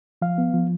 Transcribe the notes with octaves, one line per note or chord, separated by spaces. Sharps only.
F3 F5
B3
F3